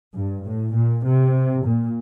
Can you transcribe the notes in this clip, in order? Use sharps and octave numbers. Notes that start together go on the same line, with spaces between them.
G2
A2
A#2
C3
A#2